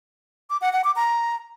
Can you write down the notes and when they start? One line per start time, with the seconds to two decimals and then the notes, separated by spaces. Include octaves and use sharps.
0.50 D6
0.61 F#5
0.73 F#5
0.84 D6
0.96 A#5